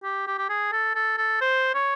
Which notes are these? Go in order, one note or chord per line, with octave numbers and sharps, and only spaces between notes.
G4
G4
G4
G#4
A4
A4
A4
C5
C#5